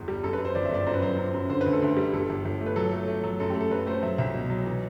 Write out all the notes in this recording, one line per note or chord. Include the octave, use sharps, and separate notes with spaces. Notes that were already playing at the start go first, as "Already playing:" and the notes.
Already playing: G1 E2
G3
F#2 A4
B4
F#2
C5
G1 D5
E5
G1 D5
F#2 C5
B4
F#3 C5
F#2
F#2
D3 C5
B4
D2
A4
D2 B4
G3
G1 A4
G1
G1
A3
B4
F#3 A4
A3
A3
F#3
F#2 A4
G4
A3
A4
F#2 B4
A3 C5
F#3 E5
C2 E5
B2
F#3
E3